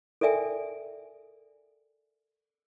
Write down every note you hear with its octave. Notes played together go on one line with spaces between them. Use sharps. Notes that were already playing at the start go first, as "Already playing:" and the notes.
A4 A#4 D5 E5 G5 G#5